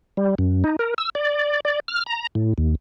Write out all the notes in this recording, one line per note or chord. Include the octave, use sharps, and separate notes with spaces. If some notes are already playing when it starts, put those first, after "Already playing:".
G3
F#2
D#4
A#4
E6
D5
D5
F6
A#5
A2
D#2